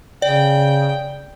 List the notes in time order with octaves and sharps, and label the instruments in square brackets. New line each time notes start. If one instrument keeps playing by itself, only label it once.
[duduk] C#3 [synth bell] D5 [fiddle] G5